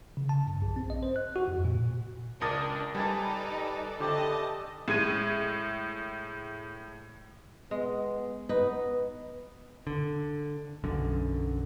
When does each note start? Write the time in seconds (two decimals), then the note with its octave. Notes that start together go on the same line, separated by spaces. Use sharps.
0.17 C#3
0.29 A5
0.47 G2
0.62 A#1
0.76 C4
0.90 D#5
1.03 C5
1.16 F#6
1.36 F#4
1.48 F2
1.65 A#2
2.41 C#2 D4 A#4 D5 A5 A#5 D#6
2.95 G3 D#4 A4 B4 D5 G#5 A5
4.00 D3 A3 G4 D5 D#5 A5
4.88 A2 G#3 G#6 D#7
7.71 G#3 B3
8.49 B3 D#4 B4
9.87 D3
10.84 B1 F#2 D3